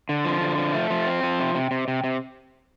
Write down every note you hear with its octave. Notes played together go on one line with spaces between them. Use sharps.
D3
F3
D3
F3
A3
F3
C4
F3
C3
C3
C3
C3
C3